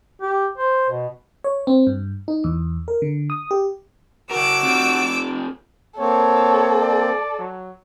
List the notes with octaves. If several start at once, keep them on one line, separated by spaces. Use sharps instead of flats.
G4
C5
B2
C#5
C4
G2
D#4
E2
A#4
D3
D#6
G4
C#3 F#4 A#4 D6 E6
C4 F4 G4
A#3 C4 A4 C#5
D5
F#3